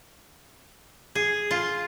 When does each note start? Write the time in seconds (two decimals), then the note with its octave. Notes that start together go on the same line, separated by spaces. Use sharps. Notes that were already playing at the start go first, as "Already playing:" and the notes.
1.15 G#4
1.51 F4